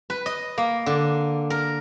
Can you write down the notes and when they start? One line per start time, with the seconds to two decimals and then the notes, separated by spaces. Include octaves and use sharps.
0.10 B4
0.26 D#5
0.58 A#3
0.86 D3
1.50 A#4